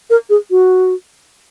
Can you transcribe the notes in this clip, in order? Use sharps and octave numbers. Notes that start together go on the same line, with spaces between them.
A#4
G#4
F#4